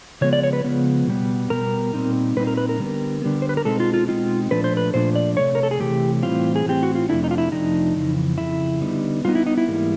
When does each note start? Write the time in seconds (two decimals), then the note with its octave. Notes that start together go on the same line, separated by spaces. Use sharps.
0.21 C#3 F3 G#3 B3 C#5
0.33 D5
0.43 C#5
0.53 B4
0.64 C#3 F3 G#3 B3
1.07 B2 G3 B3
1.50 B2 G3 B3 A#4
1.93 A#2 G3 C4 D#4
2.37 A#2 G3 C4 D#4 B4
2.47 A#4
2.57 B4
2.69 A#4
2.79 D3 G3 B3
3.22 D3 G3 B3
3.42 C5
3.49 B4
3.57 A#4
3.65 B2 G#3 C4 D#4 A4
3.80 F4
3.94 F4
4.08 B2 G#3 C4 D#4 F4
4.51 A#2 F3 A3 D4 B4
4.64 C5
4.77 B4
4.94 A#2 F3 A3 D4 C5
5.16 D5
5.37 C3 E3 A3 C#5
5.55 A#4
5.63 A4
5.71 G#4
5.80 C3 E3 A3 G4
6.23 A2 E3 G3 C4 F4
6.56 G#4
6.66 A2 E3 G3 C4 G4
6.83 F#4
6.95 F4
7.09 F2 C3 F3 A3 D4 E4
7.24 D#4
7.31 F4
7.38 E4
7.52 F2 C3 F3 A3 D4 D#4
7.96 F2 C#3 E3
8.38 F2 C#3 E4
8.81 D3 G3 B3 D#4
9.25 D3 G3 B3 D#4 F4
9.35 E4
9.46 D#4
9.58 E4
9.68 G#2 E3 G3 A#3